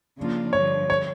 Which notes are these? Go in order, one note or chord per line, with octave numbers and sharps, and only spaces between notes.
C#3 F3 A#3 D4 F4
G2 D3 F3 C#5
C#5